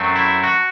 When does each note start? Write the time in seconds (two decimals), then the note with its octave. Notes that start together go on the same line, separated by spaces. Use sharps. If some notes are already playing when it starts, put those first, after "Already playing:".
Already playing: F#2 F#3 A3 C4
0.16 E4
0.43 F#4